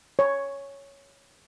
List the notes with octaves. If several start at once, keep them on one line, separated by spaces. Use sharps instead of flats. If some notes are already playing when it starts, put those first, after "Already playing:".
C#5